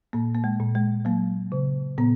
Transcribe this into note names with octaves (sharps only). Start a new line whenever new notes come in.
A#2 A#3
A#3
G#3
A#2
G#3
F#3 A#3
C#3
A#2 B3